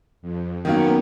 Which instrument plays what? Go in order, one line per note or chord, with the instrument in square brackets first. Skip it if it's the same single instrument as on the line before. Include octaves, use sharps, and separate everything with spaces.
[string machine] F2
[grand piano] D#3 F#3 A#3 [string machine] B3 C#4